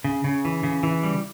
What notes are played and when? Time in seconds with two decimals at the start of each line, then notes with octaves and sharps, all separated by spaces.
0.04 C#3
0.24 C#3
0.45 E3
0.63 C#3
0.83 E3
1.03 G3